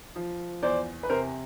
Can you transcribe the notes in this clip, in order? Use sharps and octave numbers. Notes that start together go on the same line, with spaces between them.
F3
E2 C5 D5
B4
C3 A#4 C5